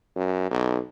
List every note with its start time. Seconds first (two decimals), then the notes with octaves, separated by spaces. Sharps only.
0.16 F#2
0.51 B1